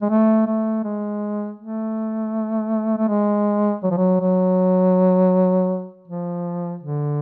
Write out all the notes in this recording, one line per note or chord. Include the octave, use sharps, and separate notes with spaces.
G#3
A3
A3
G#3
A3
A3
G#3
F#3
F3
F#3
F#3
F3
D3